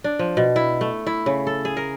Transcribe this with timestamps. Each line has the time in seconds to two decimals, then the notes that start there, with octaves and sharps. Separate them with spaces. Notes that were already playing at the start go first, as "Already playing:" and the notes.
0.04 D4
0.19 F3
0.37 B2
0.56 E4
0.81 A3
1.07 E4
1.26 C#3
1.47 A4
1.65 G#4
1.77 A#4